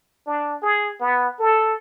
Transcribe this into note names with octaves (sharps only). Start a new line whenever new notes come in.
D4
G#4
B3
A4